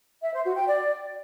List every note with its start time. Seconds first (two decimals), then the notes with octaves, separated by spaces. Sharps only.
0.22 E5
0.33 C5
0.45 F#4
0.56 G5
0.68 D5